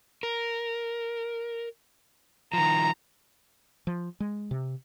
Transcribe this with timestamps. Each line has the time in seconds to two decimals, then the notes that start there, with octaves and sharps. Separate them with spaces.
0.23 A#4
2.53 D#3 F3 A#5
3.87 F3
4.20 G#3
4.51 C3